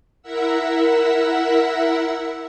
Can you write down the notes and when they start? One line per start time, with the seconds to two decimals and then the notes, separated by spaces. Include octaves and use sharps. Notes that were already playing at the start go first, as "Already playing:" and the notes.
0.22 E4 A#4 E5 F#5 E6